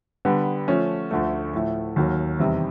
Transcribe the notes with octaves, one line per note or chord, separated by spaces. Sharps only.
D3 G3 B3
F3 A3 C#4
D2 D3 F3 A3
A2 F3 A3
D#2 D#3 F#3 A#3
E2 C3 D#3 G3